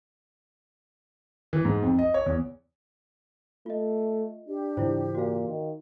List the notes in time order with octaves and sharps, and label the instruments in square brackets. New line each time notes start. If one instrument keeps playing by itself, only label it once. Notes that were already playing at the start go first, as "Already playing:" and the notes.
[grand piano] E3
G#2
F2
D#5
C#5
E2
[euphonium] A3 [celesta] F4 D#5
[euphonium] D4 [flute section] G4
[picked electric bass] G#2 C#3 E3 [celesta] E4 F4 C5
[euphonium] A#2 [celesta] F#4 F5
[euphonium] D#3